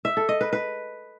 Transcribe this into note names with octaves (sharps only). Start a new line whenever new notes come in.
E5
A4
D#5
B4
B4